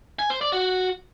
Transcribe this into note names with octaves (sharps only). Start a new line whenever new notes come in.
G#5
C5
D5
F#4